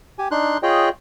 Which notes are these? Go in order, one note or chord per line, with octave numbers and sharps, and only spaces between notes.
G4 G#5
D4 D#4 C6 F#6
F4 G#4 C#5 D#5 G5